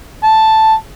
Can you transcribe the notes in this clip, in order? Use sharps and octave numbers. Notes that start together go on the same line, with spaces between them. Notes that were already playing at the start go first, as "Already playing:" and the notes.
A5